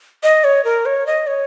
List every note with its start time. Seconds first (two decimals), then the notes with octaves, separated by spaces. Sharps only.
0.23 D#5
0.44 C#5
0.65 A#4
0.86 C#5
1.07 D#5
1.27 C#5